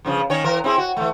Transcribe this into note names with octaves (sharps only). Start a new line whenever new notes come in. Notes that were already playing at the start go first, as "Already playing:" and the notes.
G2 C#3 F3
D#3 C#4 C#5
E3 A#4
C4 E4 G#4
F#4
E3 A3